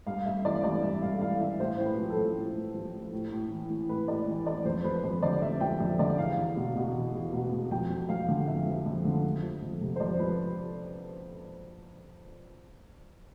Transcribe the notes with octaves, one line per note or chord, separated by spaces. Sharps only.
G2 F5
G2 E5
E3 D5
E3 D5
G2 E5
G2 F5
E3 F5
E3 E5
A2 C5
A2
B4
F3
A4
F3
A2
A2
F3
F3
A2
A2
E3
E3
A2 B4
A2 D5
E3
E3 D5
F2 C5
F3 B4
F2 C5
D3 D5
F2 E5
F3 G5
F2 E5
D3 D5
E2 F5
E2
B2
B2
E2
E2
B2
B2
F2 G5
F3
F2 F5
D3
F2 E5
F3
F2
D3
F2
F3
F2
C3
C5
F2 D5
F3 B4